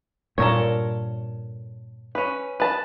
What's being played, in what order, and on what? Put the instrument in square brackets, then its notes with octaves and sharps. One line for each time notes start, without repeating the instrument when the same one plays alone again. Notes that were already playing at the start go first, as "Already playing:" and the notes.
[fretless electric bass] G2 A#2 [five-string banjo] A4 A#4 C#5
[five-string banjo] C#4 B4
B4 A5